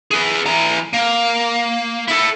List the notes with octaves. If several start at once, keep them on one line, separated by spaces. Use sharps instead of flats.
G#4 B4
E3 A#5
A#3
E4 A4